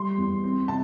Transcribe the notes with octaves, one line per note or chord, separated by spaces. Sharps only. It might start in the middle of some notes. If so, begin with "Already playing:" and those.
Already playing: G3 C6
E2
C4
C3 A5